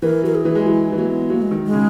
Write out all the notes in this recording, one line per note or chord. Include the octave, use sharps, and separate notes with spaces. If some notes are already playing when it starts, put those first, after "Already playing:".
E3 A#4
F#3 A#4
G#4
E3
G#3
F#3 E4
E3 D#4
F#3 A#3
B3
F#3 A#3
G#3
D#3
G#3
C#3